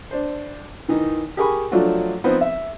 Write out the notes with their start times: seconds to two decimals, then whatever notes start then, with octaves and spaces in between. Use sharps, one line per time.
0.11 D4 C5
0.88 D#3 E3 D#4
1.37 G4 G#4 A#4 G#5 B5 C#6
1.71 F3 F#3 A3 D4 F4 F#4
2.24 F3 B3 C4 D#4 B4 C5
2.41 E5